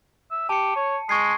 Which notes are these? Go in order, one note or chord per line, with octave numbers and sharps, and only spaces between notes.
E5
G4 A5 C#7
C#5
G#3 C#6 G#6 C7